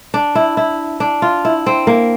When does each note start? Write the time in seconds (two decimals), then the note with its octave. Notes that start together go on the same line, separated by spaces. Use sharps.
0.14 D4
0.35 E4
0.57 E4
1.00 D4
1.22 F4
1.45 E4
1.66 C4
1.87 A#3